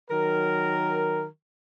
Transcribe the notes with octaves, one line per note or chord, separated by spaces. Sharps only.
D#3 F#3 A#4